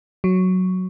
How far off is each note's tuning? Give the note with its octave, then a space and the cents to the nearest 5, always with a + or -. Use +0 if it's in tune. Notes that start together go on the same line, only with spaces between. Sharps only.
F#3 +0